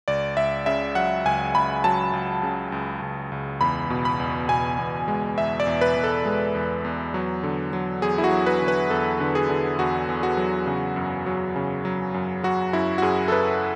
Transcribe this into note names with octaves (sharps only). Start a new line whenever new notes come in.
C#2 D5
C#2 E5
C#3 E5
F#3 F#5
C#2 G#5
C#2 B5
F#3 A5
C#2
C#3
C#2
C#2
C#2
E2 B5
B2
B5
E2
B2 G#5
E2
G#3
E2 E5
D5
E2
B4
E2
A4
G#3
E2
E2
F#3
D3
F#3
E2 G#4
E4
F#4
F#3
B4
D3
B4
E2 A4
D3
G#4
D3
E2 F#4
E2
F#4
F#3
C#3
F#2
F#3
C#3
F#3
F#2
F#3 F#4
F#2 E4
F#4
F#2 G#4
A4
F#2 B4